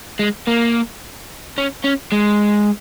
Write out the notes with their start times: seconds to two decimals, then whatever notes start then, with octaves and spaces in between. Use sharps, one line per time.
0.19 G#3
0.47 A#3
1.58 C#4
1.84 C#4
2.12 G#3